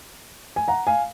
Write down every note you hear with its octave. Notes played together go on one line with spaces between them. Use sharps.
G#5
F#5 A#5
F5 G#5